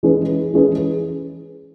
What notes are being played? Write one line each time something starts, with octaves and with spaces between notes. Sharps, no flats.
E3 G#3 C#4 G#4 B4
E3 G#3 C#4 G#4 B4